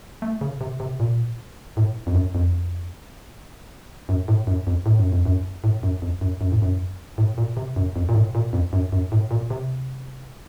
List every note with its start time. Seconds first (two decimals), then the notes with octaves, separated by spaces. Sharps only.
0.22 A3
0.41 C#3
0.61 C3
0.80 C3
1.00 A#2
1.77 A2
2.07 F2
2.15 F#2
2.35 F2
4.09 F#2
4.28 A2
4.47 F#2
4.67 F2
4.86 A2
4.99 F#2
5.12 F2
5.25 F#2
5.64 A2
5.83 F#2
6.02 F2
6.21 F#2
6.41 F#2
6.52 A2
6.62 F#2
7.18 A2
7.38 A#2
7.57 C3
7.76 F#2
7.96 F2
8.09 A#2
8.15 A2
8.35 A#2
8.53 F2
8.73 F#2
8.92 F#2
9.12 A2
9.31 A#2
9.50 C3